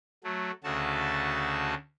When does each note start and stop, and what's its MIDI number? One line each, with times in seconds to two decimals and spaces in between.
0.24 0.51 54
0.24 0.51 57
0.64 1.75 38
0.64 1.75 49
0.64 1.75 57
0.64 1.75 66
0.64 1.75 81